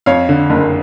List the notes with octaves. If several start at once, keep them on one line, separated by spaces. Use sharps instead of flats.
F2 C#5 F5
D3
F#1